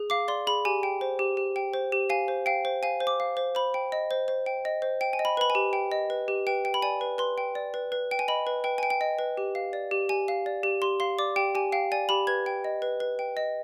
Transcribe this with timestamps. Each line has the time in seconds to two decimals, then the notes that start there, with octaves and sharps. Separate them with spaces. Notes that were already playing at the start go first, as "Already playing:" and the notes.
Already playing: G#4
0.10 F5 D6
0.28 D5 C6
0.47 G#4 B5
0.65 G4 G#5
0.83 G5
1.01 C5
1.19 G4
1.37 G4
1.56 G5
1.73 C5
1.92 G4
2.10 F5 G#5
2.28 C5
2.46 F5 G5
2.65 C5
2.83 F5 G#5
3.00 C5
3.07 D6
3.20 F5
3.37 C5
3.55 C5 B5
3.74 G5
3.92 D#5
4.11 C5
4.28 C5
4.46 G5
4.65 D#5
4.82 C5
5.01 G5
5.13 G#5
5.19 D#5
5.25 B5
5.37 B4 B5
5.50 G#5
5.55 G4
5.73 G5
5.92 D#5
6.10 B4
6.28 G4
6.47 B4 G5
6.65 G5
6.74 B5
6.82 D5 G#5
7.01 B4
7.18 B4 C6
7.38 G5
7.55 D5
7.74 B4
7.92 B4
8.11 G5
8.19 G#5
8.28 D#5 B5
8.47 B4
8.64 B4 G5
8.78 G5 G#5
8.90 G5
9.01 D#5
9.19 B4
9.37 G4
9.55 F5
9.73 D5
9.91 G4
10.09 G4 G#5
10.28 F5
10.46 D5
10.63 G4
10.82 G4 C6
11.00 F5 C6
11.19 D5 D6
11.36 G4 G5
11.55 G4 G#5
11.72 F5 G5
11.92 D5 G#5
12.09 G4 B5
12.27 B4 G#6
12.46 G5
12.64 D#5
12.82 B4
13.00 B4
13.19 G5
13.37 D#5